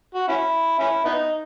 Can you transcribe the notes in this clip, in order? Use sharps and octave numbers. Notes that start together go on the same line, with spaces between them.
F#4
C#4 E4
C#4 E4
B3 D#4